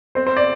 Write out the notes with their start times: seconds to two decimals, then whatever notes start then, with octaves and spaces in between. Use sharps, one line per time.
0.15 C4 C5
0.27 C5
0.37 D5